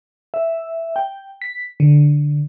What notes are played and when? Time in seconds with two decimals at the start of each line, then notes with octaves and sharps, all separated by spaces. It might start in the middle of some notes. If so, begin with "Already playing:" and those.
0.34 E5
0.96 G5
1.42 B6
1.80 D3